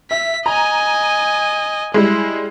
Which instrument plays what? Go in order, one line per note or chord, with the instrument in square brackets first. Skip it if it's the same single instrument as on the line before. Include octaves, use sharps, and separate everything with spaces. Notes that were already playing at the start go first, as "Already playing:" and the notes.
[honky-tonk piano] E5 [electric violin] B6
[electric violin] D#5 G#5 [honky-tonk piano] A#5
[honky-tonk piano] G3 G#3 [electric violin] E4